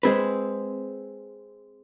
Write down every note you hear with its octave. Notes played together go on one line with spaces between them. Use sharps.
G#3 C4 G#4 B4